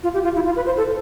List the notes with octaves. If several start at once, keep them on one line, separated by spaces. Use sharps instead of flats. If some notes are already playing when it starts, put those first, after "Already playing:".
F4
G4
F4
E4
F4
B4
C5
A4